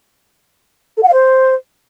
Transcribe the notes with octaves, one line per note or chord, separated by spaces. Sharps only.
A4
F#5
F5
C5